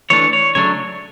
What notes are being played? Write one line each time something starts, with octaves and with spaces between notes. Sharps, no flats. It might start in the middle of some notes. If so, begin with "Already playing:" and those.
E3 A3 D4 C#5
C#5
C#3 F#3 A3 D4 C#5